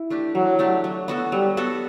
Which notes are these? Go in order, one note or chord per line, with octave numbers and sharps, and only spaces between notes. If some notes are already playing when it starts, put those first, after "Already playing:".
Already playing: E4
A3 D4 G4
E3 F#3
A3 D4 G4
F#3
B3 F#4 A4
F#3 G3
B3 F#4 A4